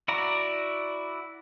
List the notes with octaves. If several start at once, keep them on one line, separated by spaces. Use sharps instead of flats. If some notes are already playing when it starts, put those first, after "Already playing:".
E4 F#4 D5 A#5